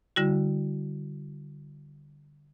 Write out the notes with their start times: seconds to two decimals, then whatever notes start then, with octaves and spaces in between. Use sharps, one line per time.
0.16 D3 G3 E4 F#4